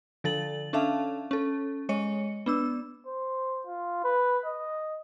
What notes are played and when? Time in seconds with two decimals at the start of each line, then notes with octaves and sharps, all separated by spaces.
0.24 D3 F3 A4 A6 F#7
0.73 C#4 D4 A4 E5 F5 A5
1.31 C#4 A4
1.89 G#3 C#5 D#5 C#7
2.46 B3 D4 E6
3.06 C5
3.66 F4
4.04 B4
4.45 D#5